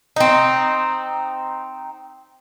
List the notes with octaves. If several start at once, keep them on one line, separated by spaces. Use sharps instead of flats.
C4 D#4